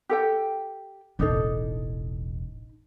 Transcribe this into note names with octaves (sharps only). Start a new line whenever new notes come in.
G4 A4 G5
E1 A1 D4 D#4 A4